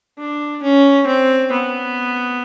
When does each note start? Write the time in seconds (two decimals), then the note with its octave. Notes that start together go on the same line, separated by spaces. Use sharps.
0.18 D4
0.63 C#4
1.07 C4
1.51 B3